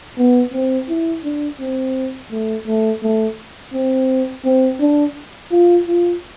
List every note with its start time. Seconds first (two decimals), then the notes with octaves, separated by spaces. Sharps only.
0.18 B3
0.54 C4
0.89 E4
1.24 D4
1.60 C4
2.31 A3
2.67 A3
3.03 A3
3.73 C4
4.45 C4
4.80 D4
5.51 F4
5.87 F4